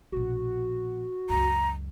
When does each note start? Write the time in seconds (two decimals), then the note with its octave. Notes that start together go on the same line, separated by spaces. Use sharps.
0.12 A#1 B2 F#4
1.29 C#2 F#2 A#5